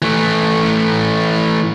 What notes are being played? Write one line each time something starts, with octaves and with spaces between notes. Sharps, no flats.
E3 A3